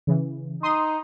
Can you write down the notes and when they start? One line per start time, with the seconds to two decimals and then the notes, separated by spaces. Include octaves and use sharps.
0.07 C#3 E3
0.63 D#4 C6 D#6